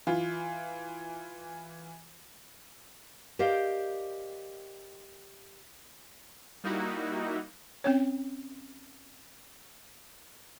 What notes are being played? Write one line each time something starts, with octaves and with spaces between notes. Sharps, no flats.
E3 F4
G4 A#4 C5 D5 D#5 F5
G3 A#3 D#4 E4 F#4
C4 C#4 C#5